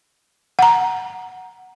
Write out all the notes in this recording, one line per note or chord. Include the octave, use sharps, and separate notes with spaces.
F#5 A#5